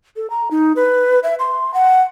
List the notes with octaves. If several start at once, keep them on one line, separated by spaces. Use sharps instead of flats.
A4
A#5
D#4
B4
E5
C6
F#5